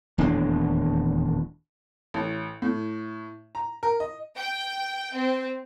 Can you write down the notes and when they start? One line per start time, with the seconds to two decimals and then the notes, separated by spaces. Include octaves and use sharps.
0.18 D#1 E2 A2 D4
2.14 A1
2.62 A2
3.55 A#5
3.83 A#4
4.00 D#5
4.36 G5
5.14 C4